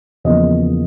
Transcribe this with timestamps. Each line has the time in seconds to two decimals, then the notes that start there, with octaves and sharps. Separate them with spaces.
0.24 E2 C#3 F3 A#3 D#5